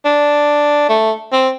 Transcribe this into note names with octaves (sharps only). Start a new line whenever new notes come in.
D4
A3
C4